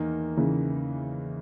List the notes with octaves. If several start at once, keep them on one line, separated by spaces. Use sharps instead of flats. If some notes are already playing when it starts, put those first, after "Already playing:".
Already playing: E2 D#3 A#3 D#4
C#3 E3